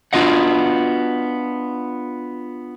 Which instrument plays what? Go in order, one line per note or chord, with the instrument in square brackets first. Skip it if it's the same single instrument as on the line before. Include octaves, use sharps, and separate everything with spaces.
[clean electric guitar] B3 D4 F4 F#4 D#5 F#5